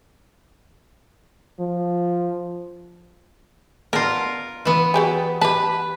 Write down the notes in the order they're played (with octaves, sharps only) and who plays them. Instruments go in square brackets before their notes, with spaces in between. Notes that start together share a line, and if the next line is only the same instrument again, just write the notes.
[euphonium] F3
[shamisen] B3 D4 [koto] F4 A#4
[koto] E3 B3
[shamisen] F#3 G4 G#4
[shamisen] G4 A5 [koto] B4